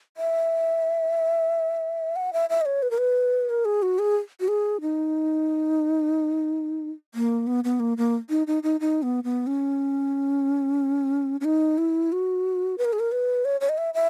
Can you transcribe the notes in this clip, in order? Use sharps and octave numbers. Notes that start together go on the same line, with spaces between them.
E5
F#5
E5
E5
D#5
C#5
B4
A#4
B4
A#4
G#4
F#4
G#4
F#4
G#4
D#4
A#3
B3
B3
A#3
A#3
D#4
D#4
D#4
D#4
B3
B3
C#4
C#4
D#4
E4
F#4
B4
A#4
G#4
A#4
B4
C#5
C#5
D#5
E5
E5